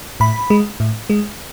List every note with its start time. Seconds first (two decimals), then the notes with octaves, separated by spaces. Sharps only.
0.20 A2 B5
0.50 G#3
0.80 A2
1.10 G#3